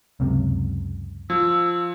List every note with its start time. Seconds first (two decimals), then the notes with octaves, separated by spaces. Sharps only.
0.20 C#2 F#2 C3
1.30 F3 E6